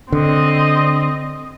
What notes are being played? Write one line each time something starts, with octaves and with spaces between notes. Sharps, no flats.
D3 C4 D#5